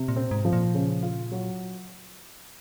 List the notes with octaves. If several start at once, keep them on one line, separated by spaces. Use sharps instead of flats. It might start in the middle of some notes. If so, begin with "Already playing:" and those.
Already playing: C3
A#2
C4
G#2
F3
A#2
C#3
F4
F#3